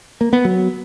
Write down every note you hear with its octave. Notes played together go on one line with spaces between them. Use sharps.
A#3
B3
F#3